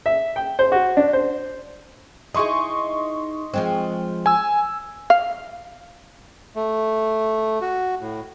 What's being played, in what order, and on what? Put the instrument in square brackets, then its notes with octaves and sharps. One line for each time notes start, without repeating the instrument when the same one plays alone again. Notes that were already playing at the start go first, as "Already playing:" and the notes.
[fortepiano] E5
G5
C5
F#4
D4
C5
[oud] D#4 E4 G#4 [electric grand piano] D#5 C6 C#6
[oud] F3 G#3 C4
[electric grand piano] G#5 E6
[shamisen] F5
[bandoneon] A3
F#4
A2